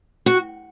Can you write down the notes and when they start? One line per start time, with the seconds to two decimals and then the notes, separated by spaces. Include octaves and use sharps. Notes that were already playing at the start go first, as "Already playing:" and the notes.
0.26 F#4